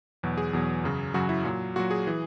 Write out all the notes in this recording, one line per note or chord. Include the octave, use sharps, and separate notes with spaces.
E2 B2 F#3
G#4
E2 B2 F#3
F#2 C#3 F#3
F#2 C#3 F#3 F#4
E4
A#2 F#3
A#2 F#3 F#4
G#4
E3